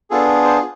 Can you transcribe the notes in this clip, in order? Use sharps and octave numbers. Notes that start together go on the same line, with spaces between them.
B3 D4 F4 G#4 A4
C5